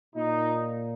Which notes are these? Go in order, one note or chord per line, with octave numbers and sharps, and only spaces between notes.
A#2 D#4